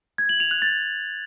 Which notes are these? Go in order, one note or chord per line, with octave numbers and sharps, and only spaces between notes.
G#6
F#7
F7
F#6
A6